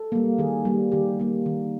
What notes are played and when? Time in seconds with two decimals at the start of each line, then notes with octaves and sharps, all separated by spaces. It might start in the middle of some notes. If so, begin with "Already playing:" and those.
Already playing: A4
0.12 G3 A#3
0.38 D#3 G#4
0.65 G3 A#3
0.92 D#3 G4
1.20 G3 A#3
1.46 D#3